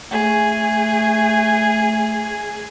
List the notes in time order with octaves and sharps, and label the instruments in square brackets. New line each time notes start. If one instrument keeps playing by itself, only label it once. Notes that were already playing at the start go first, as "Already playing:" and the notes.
[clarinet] A3 [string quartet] G#4